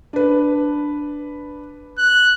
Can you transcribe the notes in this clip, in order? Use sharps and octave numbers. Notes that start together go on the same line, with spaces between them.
D4 B4
F#6